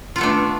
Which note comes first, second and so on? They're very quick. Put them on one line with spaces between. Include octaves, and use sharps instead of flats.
F4 B3 A3 D4